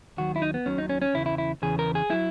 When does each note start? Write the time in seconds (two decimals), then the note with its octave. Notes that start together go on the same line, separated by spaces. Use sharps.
0.17 D#2 D#3 F#3 F#4
0.36 E4
0.42 D#4
0.54 B3
0.66 D#2 D#3 F#3 C#4
0.78 D#4
0.89 C#4
1.02 C#4
1.14 E2 C#3 E3 E4
1.26 E4
1.38 E4
1.62 E2 C#3 E3 G#4
1.79 A#4
1.95 G#4
2.10 F#3 E4